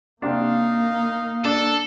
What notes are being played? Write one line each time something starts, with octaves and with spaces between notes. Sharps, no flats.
C3 A#3 D4 D#4 F5
D4 A4